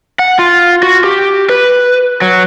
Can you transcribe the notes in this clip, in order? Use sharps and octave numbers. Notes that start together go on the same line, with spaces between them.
F#5
F4
F#4
G4
B4
F#3